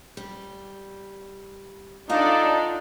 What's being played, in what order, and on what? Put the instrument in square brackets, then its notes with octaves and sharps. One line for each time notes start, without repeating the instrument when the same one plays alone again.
[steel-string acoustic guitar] G3
[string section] D4 A4 D5 [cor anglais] D#4 [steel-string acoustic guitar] F4 F#5